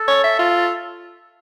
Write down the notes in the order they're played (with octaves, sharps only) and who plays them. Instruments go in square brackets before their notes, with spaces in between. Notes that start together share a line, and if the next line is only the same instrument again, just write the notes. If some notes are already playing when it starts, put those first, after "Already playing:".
Already playing: [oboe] A4
[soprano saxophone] C#5
E5
F4